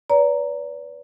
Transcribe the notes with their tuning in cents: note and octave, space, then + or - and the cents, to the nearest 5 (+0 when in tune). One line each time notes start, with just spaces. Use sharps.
B4 +0 D5 -40 A#5 +0